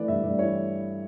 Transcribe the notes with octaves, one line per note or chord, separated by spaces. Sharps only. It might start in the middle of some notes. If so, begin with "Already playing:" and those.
Already playing: E3 A3 B4 D5
G2 E5
G2 D5
E3 C#5